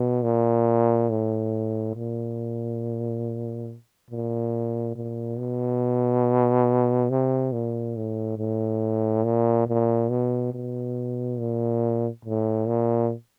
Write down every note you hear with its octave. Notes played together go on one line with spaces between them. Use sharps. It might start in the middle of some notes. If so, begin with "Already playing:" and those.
Already playing: B2
A#2
A2
A#2
A#2
A#2
B2
C3
A#2
A2
A2
A#2
A#2
B2
B2
A#2
A2
A#2